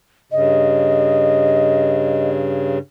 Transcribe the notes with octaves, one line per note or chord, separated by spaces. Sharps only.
G2 C#3 D#5